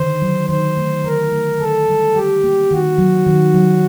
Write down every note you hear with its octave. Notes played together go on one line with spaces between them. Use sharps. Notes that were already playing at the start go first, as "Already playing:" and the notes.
Already playing: D3 D#3 C5
F#3
D#3 C5
A3
D3 A#4
A3
D3 A4
G3
G3 G4
A#3
D#3 F#4
F#3
D#3
F#3